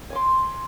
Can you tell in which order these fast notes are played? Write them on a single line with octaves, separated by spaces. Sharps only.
G#5 D6 C6